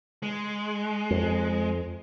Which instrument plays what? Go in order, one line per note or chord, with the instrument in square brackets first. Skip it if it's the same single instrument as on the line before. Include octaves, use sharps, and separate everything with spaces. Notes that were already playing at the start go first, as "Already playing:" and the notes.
[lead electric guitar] G#3
[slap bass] F2